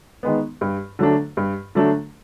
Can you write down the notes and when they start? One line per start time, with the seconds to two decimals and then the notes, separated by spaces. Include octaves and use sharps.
0.23 D#3 G#3 B3
0.61 G2
0.99 D3 F#3 A3 D4
1.37 G2
1.75 D3 F#3 A3 D4